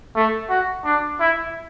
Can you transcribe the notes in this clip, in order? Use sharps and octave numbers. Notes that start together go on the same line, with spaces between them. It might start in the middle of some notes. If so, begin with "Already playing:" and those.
A3
F#4
D4
E4